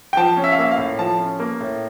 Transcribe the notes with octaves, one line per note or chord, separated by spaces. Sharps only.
G5
F3 A5
C#4
E5
F5
A#3 E5
F5
A2
F3 A5
C#4
A#3
A2